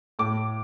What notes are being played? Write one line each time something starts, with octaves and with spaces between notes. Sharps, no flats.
A2 D6